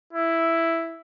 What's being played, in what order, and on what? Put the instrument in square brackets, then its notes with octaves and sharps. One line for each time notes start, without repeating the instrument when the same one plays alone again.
[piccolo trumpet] E4